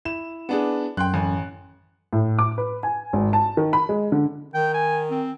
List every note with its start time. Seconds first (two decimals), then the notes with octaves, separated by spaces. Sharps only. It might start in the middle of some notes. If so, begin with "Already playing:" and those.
0.05 E4 E7
0.49 B3 D4 G#4
0.97 F#2 G5 C6 F#6
1.14 A1 G#5
2.13 A2
2.39 D6
2.58 B4
2.83 G#5
3.13 G#1
3.33 A5
3.57 D#3
3.73 B5
3.89 G#3
4.12 D3
4.54 D#3 G5
4.74 G#5
5.10 C4